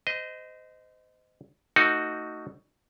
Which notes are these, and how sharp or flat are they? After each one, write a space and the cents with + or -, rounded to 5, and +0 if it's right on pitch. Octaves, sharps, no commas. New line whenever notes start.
C5 -30 D#5 +0
A3 +25 D#4 +0 F#4 +0